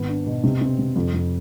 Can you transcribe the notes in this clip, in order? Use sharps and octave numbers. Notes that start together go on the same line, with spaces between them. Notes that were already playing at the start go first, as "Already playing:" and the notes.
Already playing: G#1 B3
D4
B2
C3
C4
C3
F2
F2